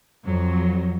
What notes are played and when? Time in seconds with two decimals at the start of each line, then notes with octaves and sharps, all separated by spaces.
0.24 F2 F#3